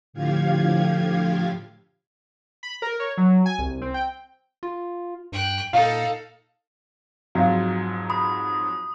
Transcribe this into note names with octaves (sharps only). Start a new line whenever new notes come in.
A2 D3 F3 G4 F5 G#6
B5
A#4
C#5
F#3
G#5
C2
C4
G5
F4
G2 G5 F#6
A#2 D#4 A4 F5
F2 G#2 F#3 F#4 F5
B5 D#6